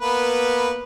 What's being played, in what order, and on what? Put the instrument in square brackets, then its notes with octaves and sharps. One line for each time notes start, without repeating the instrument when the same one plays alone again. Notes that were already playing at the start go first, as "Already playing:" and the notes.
[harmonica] A#3 B3 B4